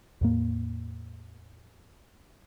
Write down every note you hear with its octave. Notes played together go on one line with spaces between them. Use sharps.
E2 A2 A#3